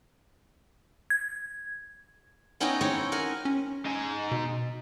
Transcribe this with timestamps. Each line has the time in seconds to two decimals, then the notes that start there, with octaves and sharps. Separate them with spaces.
1.10 G#6
2.60 B3 C#4 D#4 E4 D#5 G5
2.81 C4 C#4 D#4 E4 C#5 G5
3.12 A#4 F#5 G#5
3.45 C#4
3.86 D#4 G#5
4.31 B2